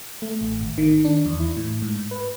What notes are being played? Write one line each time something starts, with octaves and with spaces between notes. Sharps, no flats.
A3
A1
G#1
D#3
D4
E2
E4
A2
G#2
B4